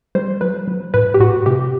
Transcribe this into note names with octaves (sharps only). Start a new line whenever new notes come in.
G3 C5
F#3 B4
F#3
A2 B4
G4
A2 F#4
C3 G4